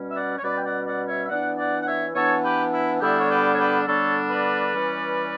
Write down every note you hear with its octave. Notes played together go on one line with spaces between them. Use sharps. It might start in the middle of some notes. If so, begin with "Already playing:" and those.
Already playing: B2 G3 C#4
E5
D5 F#5
C#5
B2 G3 C#4 B4 D5
G5
D5 F#5
D5 F#5
C#5 E5
E5
E3 B3 D4 D5 F#5
D5 F#5
F#5
C#5 E5
E3 B3 D4 A4 C#5
G4 B4
E4
D3 G3 B3 D4 E4 G4
C#5
G4 B4
C#5
G4 B4
D3 G3 B3 D4 A4 C#5
B4 D5
E3 G3 C#4